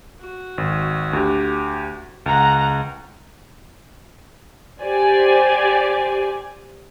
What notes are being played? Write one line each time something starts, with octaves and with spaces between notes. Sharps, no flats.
F#4
G#1
D2 G4
C#2 F#5 A#5
G4 C5 D5 G#5